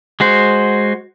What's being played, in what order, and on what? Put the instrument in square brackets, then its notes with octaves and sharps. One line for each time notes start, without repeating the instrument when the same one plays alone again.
[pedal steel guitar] G#3 F#4 C5